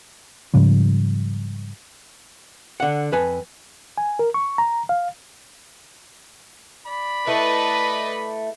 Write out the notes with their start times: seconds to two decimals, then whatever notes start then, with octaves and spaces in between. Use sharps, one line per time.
0.54 G#2 C#3 F3 G3
2.80 D3 F#5
3.12 F2 B4 G#5 A5
3.98 G#5
4.19 A#4
4.34 C#6
4.58 A#5
4.89 F5
6.86 D5 B5
7.27 A3 E4 B4 D#5